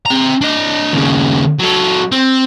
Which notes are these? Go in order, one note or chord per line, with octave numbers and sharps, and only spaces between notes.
C4 A#5
D4 D#5
D#2 C#3
F#3 A4
C4